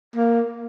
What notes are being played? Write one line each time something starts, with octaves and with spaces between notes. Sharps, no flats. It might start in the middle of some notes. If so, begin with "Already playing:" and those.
A#3